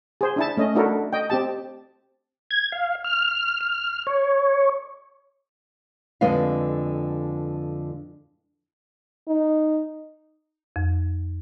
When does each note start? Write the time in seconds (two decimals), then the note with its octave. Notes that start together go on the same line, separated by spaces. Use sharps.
0.21 G#4 C5
0.36 D4 E4 A5
0.57 A3 C#4 D#5
0.75 A3 D4 E4 F#4 A4 A#4
1.13 D#5 G5
1.30 C4 G4 A5
2.51 G#6
2.72 F5
3.04 F6
3.61 F6
4.07 C#5
6.21 F2 D3 G#3 B4 F5
9.28 D#4
10.76 F2